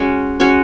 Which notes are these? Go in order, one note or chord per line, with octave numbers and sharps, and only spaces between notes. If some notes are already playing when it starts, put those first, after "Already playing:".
Already playing: G#3 C#4 F#4 C#5
G#3 C#4 F#4 C#5